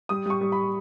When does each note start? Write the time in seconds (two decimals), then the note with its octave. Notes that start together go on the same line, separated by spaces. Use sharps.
0.09 G3 D#6
0.26 G3 C#6
0.41 G3
0.52 B5